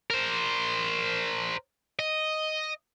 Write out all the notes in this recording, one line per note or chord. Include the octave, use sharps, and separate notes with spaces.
A#4 C5
D#5